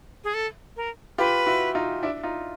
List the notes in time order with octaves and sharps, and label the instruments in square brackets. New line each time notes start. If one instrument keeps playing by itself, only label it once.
[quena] G#4
A4
A#4
[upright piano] F4 G4 [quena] B4
[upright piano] E4 F#4
D#4 F4
D4 E4
D#4 F4